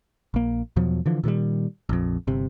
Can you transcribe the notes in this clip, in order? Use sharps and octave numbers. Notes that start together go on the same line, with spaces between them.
A#1 A#3
E2 B2 F3 F#3
D3 E3 F3
A#2 D#3 F#3 G3
A#1 F2
G1 C3